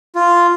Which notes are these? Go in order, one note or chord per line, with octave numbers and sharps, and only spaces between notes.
F4